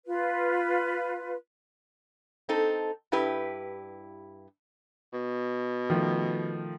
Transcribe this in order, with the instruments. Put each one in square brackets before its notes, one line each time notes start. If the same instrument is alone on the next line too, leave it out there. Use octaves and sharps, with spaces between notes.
[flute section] F4 B4
[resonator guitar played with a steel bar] C4 D#4 A4
G2 E4 G4 B4
[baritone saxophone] B2
[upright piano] D#3 F3 A3